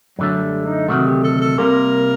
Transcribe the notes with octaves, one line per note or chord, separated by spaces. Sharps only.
F#2 D3 F#3 A3
F#3
G3
D#4
D2 C3 D#3 F#3 A3 F#4
G4
A4
A4
C2 C3 G3 A#3 A#4